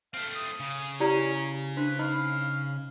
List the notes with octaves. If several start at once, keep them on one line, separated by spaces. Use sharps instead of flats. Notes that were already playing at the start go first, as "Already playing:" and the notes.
A3 C4 F5
D#6
C#3
C#4 E4 G4 C#5 D5 A#5
D4 B4 C5
D#4 D#5 F5 B5